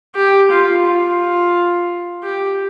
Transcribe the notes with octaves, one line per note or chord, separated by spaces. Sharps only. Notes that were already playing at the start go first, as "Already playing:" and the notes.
G4
F4
F4
G4